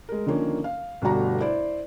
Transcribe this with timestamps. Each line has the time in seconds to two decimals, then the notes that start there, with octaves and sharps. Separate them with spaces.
0.09 G#3 A#4
0.26 D3 D#3 F3 A#3 C#4
0.64 F5
1.02 G1 B2 G3 A3 F#4 A#5
1.41 E4 C5 D5